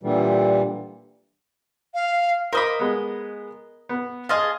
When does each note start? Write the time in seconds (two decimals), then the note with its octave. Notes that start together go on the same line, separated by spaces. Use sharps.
0.03 A#2 D3 E3 G3
1.94 F5
2.53 A#4 C5 D#5 F5 B5 D6
2.80 G#3 B3
3.89 B3
4.29 G#4 D#5 F5 A5 C6 F6